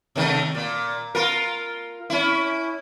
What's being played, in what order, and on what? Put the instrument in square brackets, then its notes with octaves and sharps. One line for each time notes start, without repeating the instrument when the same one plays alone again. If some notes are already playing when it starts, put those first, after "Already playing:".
[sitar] C3 D#3 A3
A#2
F4 A#4
C#4 E4